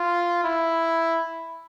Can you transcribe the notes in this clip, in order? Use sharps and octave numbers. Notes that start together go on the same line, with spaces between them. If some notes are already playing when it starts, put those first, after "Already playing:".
Already playing: F4
E4